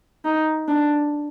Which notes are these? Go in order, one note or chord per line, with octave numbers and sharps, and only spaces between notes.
D#4
D4